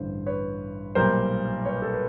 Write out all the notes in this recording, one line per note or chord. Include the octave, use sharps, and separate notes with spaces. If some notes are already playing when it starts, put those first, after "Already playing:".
Already playing: A1 G2 D3 C5
B4 C#5
B1 A#2 G3 A#4 C5
B4 C#5
A4 B4
B4